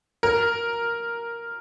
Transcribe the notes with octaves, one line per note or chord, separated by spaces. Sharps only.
A#4